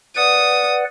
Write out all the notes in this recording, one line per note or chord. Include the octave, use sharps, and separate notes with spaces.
B4 D5 F#5 D#6